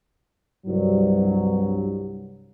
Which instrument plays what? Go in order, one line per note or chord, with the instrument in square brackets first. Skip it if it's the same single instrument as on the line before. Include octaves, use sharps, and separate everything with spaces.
[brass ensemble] C2 G2 F#3